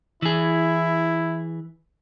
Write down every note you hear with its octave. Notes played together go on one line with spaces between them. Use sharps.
E3 E4 G#4